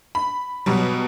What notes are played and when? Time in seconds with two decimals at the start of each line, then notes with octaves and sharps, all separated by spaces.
0.15 B5
0.66 B2 F#3 G3